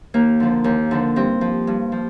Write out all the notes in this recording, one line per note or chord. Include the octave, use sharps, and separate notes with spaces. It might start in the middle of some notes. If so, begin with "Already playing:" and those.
D#2 A#3
D3 F3
D#2
D3 F3
G2 C4
F3
G2
F3